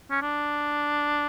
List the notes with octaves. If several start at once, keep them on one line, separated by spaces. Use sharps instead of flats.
C#4
D4